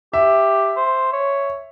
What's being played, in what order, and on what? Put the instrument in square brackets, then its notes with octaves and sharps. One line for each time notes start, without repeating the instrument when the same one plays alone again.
[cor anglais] G4 [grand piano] E5
[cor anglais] C5
C#5